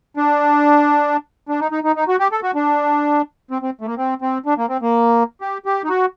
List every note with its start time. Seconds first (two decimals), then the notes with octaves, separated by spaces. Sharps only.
0.17 D4
1.49 D4
1.60 D#4
1.71 D#4
1.84 D#4
1.96 D#4
2.08 F#4
2.19 G4
2.32 A4
2.43 F#4
2.55 D4
3.51 C4
3.62 C4
3.81 A3
3.86 A#3
3.98 C4
4.22 C4
4.46 D4
4.58 A#3
4.69 C4
4.82 A#3
5.41 G4
5.66 G4
5.84 D#4
5.89 F#4